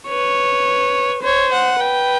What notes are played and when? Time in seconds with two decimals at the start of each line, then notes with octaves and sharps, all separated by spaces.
0.09 B4 C#5
1.23 C5 C#5
1.53 F#5
1.80 B4 G5